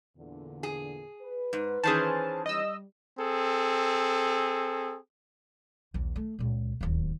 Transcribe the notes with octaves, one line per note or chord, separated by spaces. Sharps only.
E2 A#2 D3
G#4
B4
G#2
D#3 E3 C#4 G#4 C5 A5
G3 D#5 E6
C4 G#4 A4
A#1 D#2
A3
C#2 A#2
D1 D#2